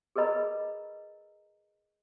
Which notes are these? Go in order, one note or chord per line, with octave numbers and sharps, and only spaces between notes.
G#4 A#4 B4 D#5 A#5 B5